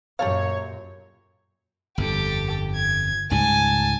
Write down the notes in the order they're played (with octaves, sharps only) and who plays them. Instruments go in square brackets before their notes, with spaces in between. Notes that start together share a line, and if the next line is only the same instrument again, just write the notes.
[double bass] F#2 A#2 [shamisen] G4 A4 F5 [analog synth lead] C#5
[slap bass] G1 F2 [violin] G4 A4
[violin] G#6
[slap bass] C#2 G#2 G3 [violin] G#5 A5